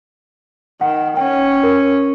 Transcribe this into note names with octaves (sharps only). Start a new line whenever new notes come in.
D#3 F#5
C#4 G5
A#4